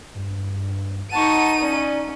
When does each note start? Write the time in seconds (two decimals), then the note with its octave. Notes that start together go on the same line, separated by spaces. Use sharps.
0.15 G2
1.12 D#4 F#5 A5 C#6 D#7
1.61 C#4 D5